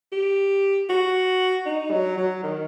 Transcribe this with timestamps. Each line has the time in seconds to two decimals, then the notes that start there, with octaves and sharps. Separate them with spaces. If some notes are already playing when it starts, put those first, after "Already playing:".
0.12 G4
0.89 F#4
1.66 D#4
1.91 F#3
2.17 F#3
2.43 D#3